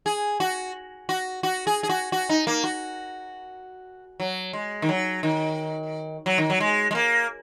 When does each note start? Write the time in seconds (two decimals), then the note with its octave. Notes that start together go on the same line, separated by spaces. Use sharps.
0.06 G#4
0.40 F#4
1.09 F#4
1.43 F#4
1.67 G#4
1.83 G#4
1.89 F#4
2.12 F#4
2.29 D#4
2.47 A#3
2.64 F#4
4.20 F#3
4.53 G#3
4.82 D#3
4.89 F#3
5.23 D#3
6.26 F#3
6.38 D#3
6.50 F#3
6.60 G#3
6.91 G#3
6.95 A#3